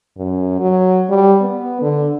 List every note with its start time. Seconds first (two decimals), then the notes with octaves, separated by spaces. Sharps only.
0.17 F#2
0.60 F#3
1.10 G3
1.42 B3
1.82 D3